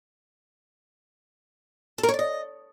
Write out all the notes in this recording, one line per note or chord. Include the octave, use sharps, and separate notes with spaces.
A4
A#4
C#5
D5
D#5